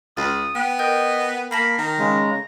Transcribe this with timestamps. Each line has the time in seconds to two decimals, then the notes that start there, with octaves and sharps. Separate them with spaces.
0.17 C#2 D#6 A6
0.55 B3 G5
0.79 A#4 D#5 G5 G6
1.51 A#3 A5 B5 A#6 B6
1.78 D#3 A#5
1.98 C#3 G#3